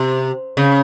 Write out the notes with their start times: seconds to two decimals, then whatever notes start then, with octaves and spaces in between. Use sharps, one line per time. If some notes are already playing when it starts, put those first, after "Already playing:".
Already playing: C3
0.57 C#3